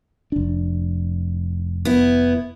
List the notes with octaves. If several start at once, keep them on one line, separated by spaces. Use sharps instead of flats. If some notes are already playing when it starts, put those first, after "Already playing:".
F1 D4
B3 E4